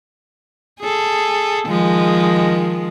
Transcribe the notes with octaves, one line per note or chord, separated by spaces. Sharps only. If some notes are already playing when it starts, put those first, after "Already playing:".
G#4 A4
D#3 F3 G#3